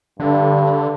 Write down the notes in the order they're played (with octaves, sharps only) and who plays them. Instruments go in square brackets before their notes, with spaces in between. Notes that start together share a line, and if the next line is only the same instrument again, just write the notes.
[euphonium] G2 [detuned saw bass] D3